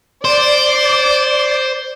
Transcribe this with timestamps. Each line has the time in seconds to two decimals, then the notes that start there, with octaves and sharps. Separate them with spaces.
0.25 C5 D5